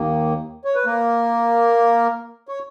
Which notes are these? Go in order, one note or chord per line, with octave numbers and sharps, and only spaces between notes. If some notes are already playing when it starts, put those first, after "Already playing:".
Already playing: D#2 D#3 A#3
C#5
B4
A#3 A#4
C#5